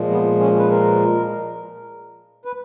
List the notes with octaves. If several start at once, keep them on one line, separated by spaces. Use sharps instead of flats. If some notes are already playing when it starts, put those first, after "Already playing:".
Already playing: A#2 F3 G#3
B3
C#4
B4
A#4
B4